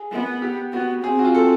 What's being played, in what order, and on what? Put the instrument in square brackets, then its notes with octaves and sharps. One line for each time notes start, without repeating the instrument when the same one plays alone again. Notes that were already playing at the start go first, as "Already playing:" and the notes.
Already playing: [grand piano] G#4
[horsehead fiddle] B3
[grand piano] G4
[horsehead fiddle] B3 [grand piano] F#4
[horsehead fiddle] C4 [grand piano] G#4
[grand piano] F#4
F4
A4